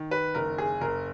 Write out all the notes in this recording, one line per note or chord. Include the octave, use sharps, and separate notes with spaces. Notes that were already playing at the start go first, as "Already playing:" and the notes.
Already playing: D#3
B4
F#1 A#4
G#4
F#1 A#4